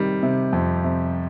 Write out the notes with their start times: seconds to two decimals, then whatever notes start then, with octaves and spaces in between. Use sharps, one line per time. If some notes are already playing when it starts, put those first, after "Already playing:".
Already playing: C3 D#3 G3
0.23 C3
0.53 F2
0.84 C3